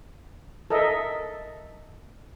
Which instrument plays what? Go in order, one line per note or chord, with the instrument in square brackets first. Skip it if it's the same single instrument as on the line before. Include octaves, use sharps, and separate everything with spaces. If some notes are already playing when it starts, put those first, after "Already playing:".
[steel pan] A4 A#4 D#5 E5